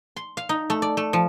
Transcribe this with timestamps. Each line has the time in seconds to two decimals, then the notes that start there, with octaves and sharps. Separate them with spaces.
0.16 C6
0.37 F5
0.49 D#4
0.70 A3
0.82 D5
0.97 A3
1.13 F3